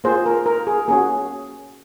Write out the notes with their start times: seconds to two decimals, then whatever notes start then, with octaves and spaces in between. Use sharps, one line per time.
0.04 A#3 F4 G#4 C5
0.26 A#4
0.46 A#4
0.67 G#4
0.88 A#3 C#4 F#4 G#4